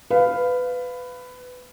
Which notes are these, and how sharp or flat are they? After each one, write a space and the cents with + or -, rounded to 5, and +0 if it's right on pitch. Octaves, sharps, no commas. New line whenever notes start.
B4 +15 F5 +0